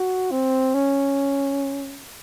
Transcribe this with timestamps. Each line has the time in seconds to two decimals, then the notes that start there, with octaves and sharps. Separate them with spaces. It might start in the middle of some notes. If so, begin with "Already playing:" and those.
Already playing: F#4
0.31 C4
0.74 C#4